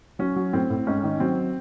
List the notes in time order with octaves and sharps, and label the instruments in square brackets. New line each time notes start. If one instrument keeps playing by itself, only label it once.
[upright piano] F#3 C#4
F#3
A2 C4
A2
G#2 C#4
D#3
F#3 C4